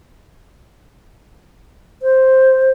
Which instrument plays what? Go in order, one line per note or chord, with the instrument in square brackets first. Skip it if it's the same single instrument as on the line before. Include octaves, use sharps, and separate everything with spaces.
[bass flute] C5